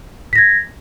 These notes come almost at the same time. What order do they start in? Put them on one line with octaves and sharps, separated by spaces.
B6 A#6 G#6